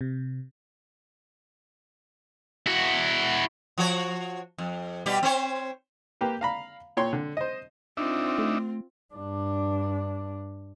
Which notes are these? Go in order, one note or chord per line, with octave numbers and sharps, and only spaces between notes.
C3
E4 F#4
F3 F#4 C#5
F2
B2 G3 G4
C4 C5 C#5
A#3 G4 B4
F5 A#5 B5
A#2 C#5 G5 C6
D3
C5 D#5
C4 D4 D#4 F4 E5
A3
G2 D4